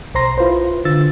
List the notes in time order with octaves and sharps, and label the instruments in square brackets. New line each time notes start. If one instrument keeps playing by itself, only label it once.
[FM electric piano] B1 C5 A#5 C6 A#6
E4 F4 B4 C5
D3 F4 E6 A6